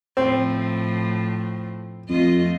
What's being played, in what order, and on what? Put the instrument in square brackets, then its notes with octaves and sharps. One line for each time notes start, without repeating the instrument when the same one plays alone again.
[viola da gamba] A2 F3 [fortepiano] C4
[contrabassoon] F2 [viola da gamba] A3 F4 D#5